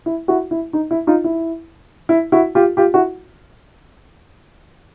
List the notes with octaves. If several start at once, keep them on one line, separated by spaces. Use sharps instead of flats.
E4
E4 F#4
E4
D#4
E4
D#4 F4
E4
E4
E4 F#4
F4 G4
F4 G4
E4 F#4